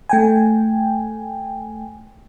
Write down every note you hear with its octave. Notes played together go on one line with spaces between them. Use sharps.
A3 G5 G#5